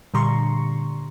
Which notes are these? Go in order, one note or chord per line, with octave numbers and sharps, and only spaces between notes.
A#2 D3 G3 A#5 C6 C#6